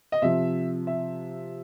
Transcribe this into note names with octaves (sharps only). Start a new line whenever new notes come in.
D#5
C3 F3 E5
E5